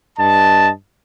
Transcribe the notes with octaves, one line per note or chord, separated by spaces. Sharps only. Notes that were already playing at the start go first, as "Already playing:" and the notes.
G2 D#5 A5